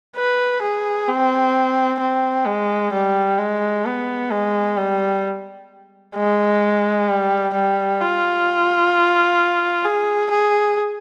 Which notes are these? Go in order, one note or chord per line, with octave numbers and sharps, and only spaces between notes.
B4
G#4
C4
C4
G#3
G3
G#3
B3
G#3
G3
G#3
G3
G3
F4
G#4
G#4